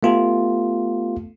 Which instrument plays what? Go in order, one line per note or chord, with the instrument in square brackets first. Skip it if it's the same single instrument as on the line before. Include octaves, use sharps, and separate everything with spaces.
[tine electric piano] A3 B3 F4 G4 A4